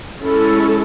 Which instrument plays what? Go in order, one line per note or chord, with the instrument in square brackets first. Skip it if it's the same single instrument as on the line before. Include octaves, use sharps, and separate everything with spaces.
[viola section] G#3 C#4 E4 A4